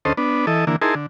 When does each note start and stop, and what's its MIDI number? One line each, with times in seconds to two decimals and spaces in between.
0.05 0.13 38
0.05 0.13 61
0.05 0.13 69
0.05 0.13 72
0.05 0.13 75
0.17 0.46 59
0.17 0.46 62
0.47 0.65 52
0.47 0.65 69
0.47 0.65 75
0.67 0.76 50
0.67 0.76 52
0.67 0.76 58
0.82 0.95 63
0.82 0.95 64
0.82 0.95 68
0.82 0.95 70
0.82 0.95 81
0.82 0.95 84
0.95 1.06 50